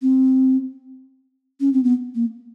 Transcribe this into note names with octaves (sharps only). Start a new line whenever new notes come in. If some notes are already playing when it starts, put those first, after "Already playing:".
C4
C#4
C4
B3
A#3